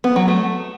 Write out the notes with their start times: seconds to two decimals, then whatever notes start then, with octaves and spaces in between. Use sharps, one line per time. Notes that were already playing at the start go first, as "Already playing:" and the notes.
0.04 B3
0.16 F#3
0.28 A3